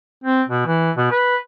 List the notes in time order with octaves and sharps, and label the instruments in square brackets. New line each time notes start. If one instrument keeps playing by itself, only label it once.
[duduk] C4
B2
E3
B2
B4